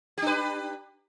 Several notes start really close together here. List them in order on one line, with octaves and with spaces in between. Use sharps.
G4 D4 B4